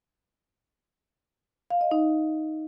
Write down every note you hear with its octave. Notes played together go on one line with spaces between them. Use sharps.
F5
D#5
D#4